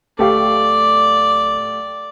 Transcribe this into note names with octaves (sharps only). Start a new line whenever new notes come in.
D1 A3 G4 D5 F5